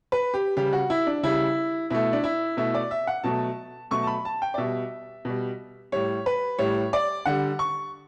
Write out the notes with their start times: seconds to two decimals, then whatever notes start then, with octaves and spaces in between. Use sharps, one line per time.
0.12 B4
0.34 G4
0.57 C#3 G3 G4
0.73 F#4
0.90 E4
1.07 D4
1.23 C#3 G3 E4
1.90 B2 A3 E4
2.13 D4
2.24 E4
2.57 B2 A3 E4
2.75 D5
2.91 E5
3.07 F#5
3.24 B2 F#3 A3 A5
3.91 B2 F#3 A3 C#6
4.03 A5
4.07 B5
4.25 A5
4.42 G5
4.54 D5
4.58 B2 G3 E5
5.25 B2 G3
5.92 A2 G3 C#5
6.26 B4
6.58 A2 G3 C#5
6.93 D5
7.26 D3 G3 F#5
7.59 C#6